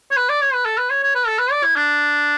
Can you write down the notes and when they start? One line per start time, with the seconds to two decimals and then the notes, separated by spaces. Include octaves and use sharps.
0.11 C#5
0.17 B4
0.29 D5
0.41 C#5
0.53 B4
0.65 A4
0.78 B4
0.90 C#5
1.03 C#5
1.15 B4
1.27 A4
1.39 B4
1.51 D5
1.64 E4
1.76 D4